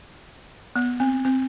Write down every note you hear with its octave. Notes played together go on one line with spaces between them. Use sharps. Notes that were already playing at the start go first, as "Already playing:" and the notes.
B3
C4
C4